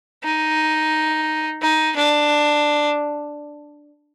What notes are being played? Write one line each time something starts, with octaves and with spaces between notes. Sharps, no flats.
D#4
D#4
D4